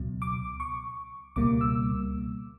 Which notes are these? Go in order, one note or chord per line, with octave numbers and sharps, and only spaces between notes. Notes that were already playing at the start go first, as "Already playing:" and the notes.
Already playing: C#2 B2 F#3
D6
C#6
C#2 B2 G3 A#3 D6
E6